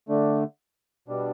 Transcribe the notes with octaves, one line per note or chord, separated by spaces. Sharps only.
D3 A3 D4
B2 G3 D4